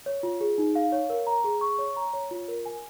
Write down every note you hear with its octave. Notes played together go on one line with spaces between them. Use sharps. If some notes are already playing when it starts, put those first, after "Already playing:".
C#5
F4
G#4
D#4
F5
C#5
A#4
A#5
G#4
C#6
C#5
A#5
C#5
F4
A#4
G#5